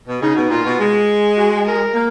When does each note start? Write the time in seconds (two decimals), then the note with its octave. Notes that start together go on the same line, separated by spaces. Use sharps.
0.08 B2
0.22 C#3 D#4
0.36 B2
0.50 A#2 F4
0.66 B2
0.80 G#3
1.37 F#4
1.66 A#4
1.94 A#3